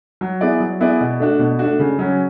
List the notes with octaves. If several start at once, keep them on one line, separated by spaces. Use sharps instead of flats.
F#3
B3 E4 G#4 D5
F#3
B3 E4 G#4 D5
B2
A3 D4 F#4
B2
A3 D4 F#4
C#3
F#3 C#4